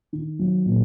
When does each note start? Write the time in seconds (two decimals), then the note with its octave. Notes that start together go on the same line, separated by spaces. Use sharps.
0.13 D#3
0.39 F#3
0.65 A#2